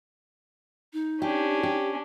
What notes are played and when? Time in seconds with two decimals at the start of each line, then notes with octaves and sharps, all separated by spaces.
0.93 D#4
1.22 C#4 D4 G4
1.63 G4